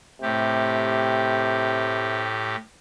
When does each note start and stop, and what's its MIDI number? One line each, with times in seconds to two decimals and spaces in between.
0.22 2.56 45
0.22 2.28 48
0.22 2.56 67